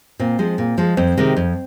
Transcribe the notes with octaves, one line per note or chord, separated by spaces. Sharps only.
A#2 C4
F3 G#3
A#2
F3 G#3
F2 C4
C3 D#3 G#3
F2